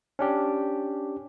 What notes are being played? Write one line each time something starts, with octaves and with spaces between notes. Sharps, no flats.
C#4 D4 G4